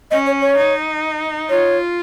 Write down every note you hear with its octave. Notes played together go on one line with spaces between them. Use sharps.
C#4 D#5
C#5
C#5
D#4
F4 C#5